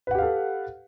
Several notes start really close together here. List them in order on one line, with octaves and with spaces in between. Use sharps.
B4 F#5 G4 F5 A4